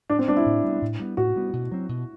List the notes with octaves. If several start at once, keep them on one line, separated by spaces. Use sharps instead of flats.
A2 D4
C4
G3 B3 D4
E4
A2
G3 B3
A2
G3 B3
A2 F#4
G3 B3
B2
F#3 C4
B2